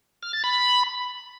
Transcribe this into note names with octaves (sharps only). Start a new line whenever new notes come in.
F6
A6
B5